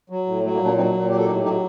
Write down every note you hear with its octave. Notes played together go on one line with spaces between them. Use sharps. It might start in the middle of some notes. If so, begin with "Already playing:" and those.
F#3
A2
F#3 A3
G3 A#3
A#2
A#3 D4
F#3 C4 D#4
A#2
F#3 G4
A4
A2 D#4 G4
F#3 D#4 G4